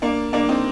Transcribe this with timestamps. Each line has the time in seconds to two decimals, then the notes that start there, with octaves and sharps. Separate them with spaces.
0.02 A#3 D4
0.33 A#3 D4
0.49 C4 D#4